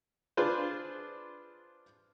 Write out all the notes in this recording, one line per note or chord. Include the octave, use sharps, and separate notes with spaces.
D4 F4 G#4 B4 C5